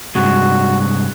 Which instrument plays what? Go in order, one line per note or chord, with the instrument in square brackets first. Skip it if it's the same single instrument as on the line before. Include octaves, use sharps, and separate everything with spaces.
[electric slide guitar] G2 C3 G#3 [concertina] F#4